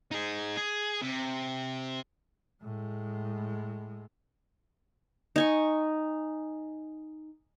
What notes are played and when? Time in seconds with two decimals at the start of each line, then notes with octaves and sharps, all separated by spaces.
0.11 D#4 G#4
0.57 G#4
1.01 C3
2.63 A2 G#3
5.36 D#4 G#5 C#6